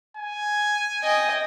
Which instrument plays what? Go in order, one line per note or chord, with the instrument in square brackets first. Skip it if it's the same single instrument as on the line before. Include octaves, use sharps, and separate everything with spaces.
[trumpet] G#5
[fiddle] D#5 G5